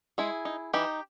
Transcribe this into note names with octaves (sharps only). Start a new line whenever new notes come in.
G#3 E4 G#4
D#4
E3 D#4 G4